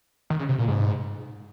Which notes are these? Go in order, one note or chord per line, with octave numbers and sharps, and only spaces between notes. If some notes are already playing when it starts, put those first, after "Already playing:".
D#3
C#3
C3
A#2
G#2